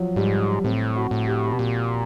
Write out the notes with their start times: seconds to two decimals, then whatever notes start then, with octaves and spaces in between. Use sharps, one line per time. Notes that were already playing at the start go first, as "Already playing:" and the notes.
Already playing: F3 F#3
0.16 G#2 G3
0.64 A2 C4
0.96 F#4
1.11 A2
1.27 G4
1.47 F#4
1.53 B2
1.59 A#2 G4